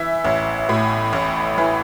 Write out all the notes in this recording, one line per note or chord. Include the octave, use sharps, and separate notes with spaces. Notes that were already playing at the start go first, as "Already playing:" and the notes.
Already playing: E3 E5
A1
A2
A1
E3